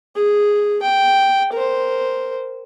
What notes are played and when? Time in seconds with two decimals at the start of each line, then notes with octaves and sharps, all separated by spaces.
0.15 G#4
0.82 G5
1.53 A#4 C5